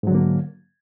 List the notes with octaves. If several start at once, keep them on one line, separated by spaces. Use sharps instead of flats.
G#2 D3 F#3 A#3